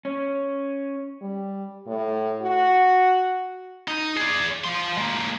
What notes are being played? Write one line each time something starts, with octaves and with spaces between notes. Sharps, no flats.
C#4
G3
A2
F#4
D#4
G#4 D5
F3 C6
G#3 A#3